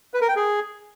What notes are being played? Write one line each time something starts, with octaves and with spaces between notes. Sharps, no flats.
B4
A#4
G5
G#4